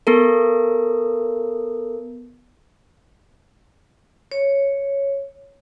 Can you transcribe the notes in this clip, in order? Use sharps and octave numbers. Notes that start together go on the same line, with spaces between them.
B3 A4 A#4
C#5